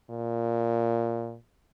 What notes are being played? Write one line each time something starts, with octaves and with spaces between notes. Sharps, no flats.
A#2